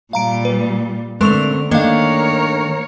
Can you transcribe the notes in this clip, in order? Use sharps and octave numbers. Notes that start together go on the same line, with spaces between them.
A#2 G3 F5 A#5 D7
B4
D3 G#3 A3 C4 A#4 C#6 F7
D#3 A3 A#3 D4 A#4 C#5 F5